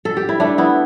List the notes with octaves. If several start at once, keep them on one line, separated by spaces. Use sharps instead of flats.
A4
G4
E4
G3 A3 D4
G3 B3 E4